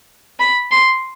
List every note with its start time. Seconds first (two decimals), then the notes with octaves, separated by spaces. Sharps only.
0.39 B5
0.71 C6